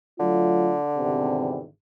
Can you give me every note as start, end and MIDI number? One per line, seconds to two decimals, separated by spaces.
0.20 1.68 50
0.20 0.76 54
0.20 0.76 57
0.20 0.76 65
0.98 1.61 32
0.98 1.61 40
0.98 1.61 48